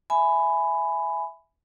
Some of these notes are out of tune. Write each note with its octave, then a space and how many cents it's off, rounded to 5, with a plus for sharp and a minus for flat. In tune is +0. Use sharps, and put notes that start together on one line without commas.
E5 +0 G#5 +5 B5 +10